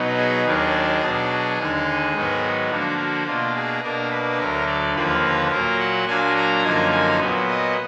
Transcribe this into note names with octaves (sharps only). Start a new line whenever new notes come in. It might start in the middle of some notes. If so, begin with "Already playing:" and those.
Already playing: B2 F#3 B3 D#4
G#4
D#2 D#3 F#3 D4 G#4
B2 F#3 D4
D#2 D3 G#3 D#4
G#2 D#3 F#3 B3 D#4
D3 F3 A#3 D4 F#4
F#4
B2 A#3 D4 F4
G#4
B2 A#3 D4 A#4
B4
D2 D3 F#3 A#4
D5
D#2 D3 F3 A#3 B4
A#2 F#3 A#3 A#4
F#5
A#2 F#3 A#3 D4 G#5
A#5
F#2 D3 F3 A#3 D#4 G#5
G#5
A#2 F#3 B3
D#5